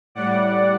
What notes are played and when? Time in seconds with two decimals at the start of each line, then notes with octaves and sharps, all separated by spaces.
0.15 A2 G3 D5 F#5